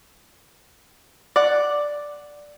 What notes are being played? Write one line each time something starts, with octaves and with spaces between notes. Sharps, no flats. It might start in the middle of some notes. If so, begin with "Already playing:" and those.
D5 F#5